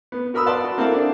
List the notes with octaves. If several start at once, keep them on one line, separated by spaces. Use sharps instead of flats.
B3
F#4 A#4 B5 D#6 E6
B4 D5 F#5 A5 C6
F#4
A#3 C4 E4 A4 F#5 A5
D4